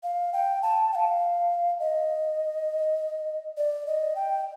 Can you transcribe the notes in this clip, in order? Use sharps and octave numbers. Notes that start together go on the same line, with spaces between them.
F5
G5
A5
G5
F5
D#5
D5
D#5
G5